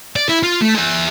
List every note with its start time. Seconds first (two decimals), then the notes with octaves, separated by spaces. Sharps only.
0.16 D5
0.29 E4
0.43 F4
0.61 A3
0.74 G#4 E5